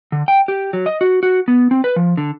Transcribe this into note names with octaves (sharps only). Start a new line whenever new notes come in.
D3
G5
G4
F#3
D#5
F#4
F#4
B3
C4
B4
F3
D3